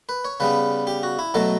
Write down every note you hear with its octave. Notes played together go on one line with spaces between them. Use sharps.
B4
C#5
C#3 G3 B3 B4
G4
F#4
E4
B2 F#3 A3 A4